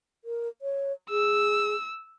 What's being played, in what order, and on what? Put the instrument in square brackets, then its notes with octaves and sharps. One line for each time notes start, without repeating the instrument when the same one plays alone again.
[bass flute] A#4
C#5
[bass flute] G#4 [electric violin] E6